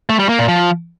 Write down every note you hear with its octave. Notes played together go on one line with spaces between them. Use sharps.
A3
G3
A#3
A#2
F3